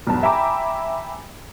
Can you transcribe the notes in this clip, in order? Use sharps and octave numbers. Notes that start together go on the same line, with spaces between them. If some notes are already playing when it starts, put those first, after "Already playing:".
B1 E2 G2 A5
E5 G5 G#5 A#5 B5 D6